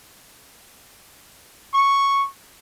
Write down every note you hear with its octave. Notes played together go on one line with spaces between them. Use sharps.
C#6